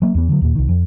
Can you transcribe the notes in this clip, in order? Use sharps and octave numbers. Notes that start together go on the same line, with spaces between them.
F#3 A#3
E2 B3
D3 F#3
D#2 A#2
C2 D#3
F2